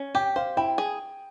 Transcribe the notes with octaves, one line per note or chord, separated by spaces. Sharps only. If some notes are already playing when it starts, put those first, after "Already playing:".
Already playing: C#4
G4 G5
C5 F5
E4 G5
G#4